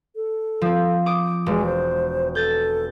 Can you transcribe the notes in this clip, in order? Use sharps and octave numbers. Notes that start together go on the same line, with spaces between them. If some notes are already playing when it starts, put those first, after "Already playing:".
A4
F3 C4
D6 D#6
E1 G#3
C5
A4 G6 A6